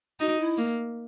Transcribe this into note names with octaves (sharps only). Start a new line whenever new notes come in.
D#4 F#4
E4
A#3